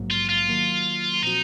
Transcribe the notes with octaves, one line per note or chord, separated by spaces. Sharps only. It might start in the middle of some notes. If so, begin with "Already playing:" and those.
Already playing: A#1 G#2 F#3 A#3
F4
F4
D#3 F#3 A#3
A#2 F3 C4 D#4 F#4